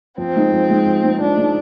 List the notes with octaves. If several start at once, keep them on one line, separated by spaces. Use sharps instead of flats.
F3 C4
G#3 D#4
F3
G#3 D#4
F3
G#3 D#4
F3 D4
G#3 D#4